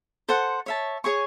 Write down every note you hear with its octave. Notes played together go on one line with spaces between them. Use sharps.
A4 C5 F#5
C#5 E5 A5
G#4 C#5 G#5 C#6